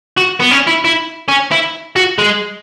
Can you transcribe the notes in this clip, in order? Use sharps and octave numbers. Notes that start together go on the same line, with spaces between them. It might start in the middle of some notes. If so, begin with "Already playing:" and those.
F#4
B3
C#4
E4
E4
C#4
E4
F#4
G#3